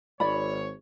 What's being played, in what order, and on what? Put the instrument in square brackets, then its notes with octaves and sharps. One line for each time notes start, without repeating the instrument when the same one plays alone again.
[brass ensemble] G#1 C#5 [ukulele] D5 B5